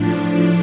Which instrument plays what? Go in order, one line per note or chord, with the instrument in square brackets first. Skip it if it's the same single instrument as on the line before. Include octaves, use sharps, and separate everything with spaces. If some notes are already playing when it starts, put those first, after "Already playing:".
Already playing: [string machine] A2 F3 D4